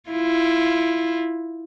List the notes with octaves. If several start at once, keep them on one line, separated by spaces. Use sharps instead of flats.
E4 F4